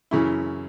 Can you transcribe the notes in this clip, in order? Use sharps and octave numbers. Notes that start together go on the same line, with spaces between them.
F#2 C#3 E3 E4